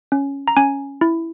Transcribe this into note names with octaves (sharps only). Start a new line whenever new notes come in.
C#4
A#5
C#4 G#5
E4